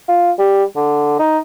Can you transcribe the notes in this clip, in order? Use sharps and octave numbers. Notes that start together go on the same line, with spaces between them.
F4
G3
D3
D#4